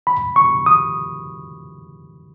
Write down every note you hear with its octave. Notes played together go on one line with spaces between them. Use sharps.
B5
C#6
D#6